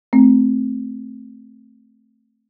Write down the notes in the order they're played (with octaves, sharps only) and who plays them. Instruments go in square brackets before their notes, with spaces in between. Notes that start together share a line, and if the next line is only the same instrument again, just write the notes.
[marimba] A3 C4